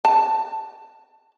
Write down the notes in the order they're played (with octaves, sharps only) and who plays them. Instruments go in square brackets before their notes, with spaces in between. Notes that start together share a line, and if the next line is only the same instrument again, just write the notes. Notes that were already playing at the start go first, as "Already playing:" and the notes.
[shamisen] A5